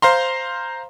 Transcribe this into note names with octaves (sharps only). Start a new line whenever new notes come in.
C5 F5 A#5 C6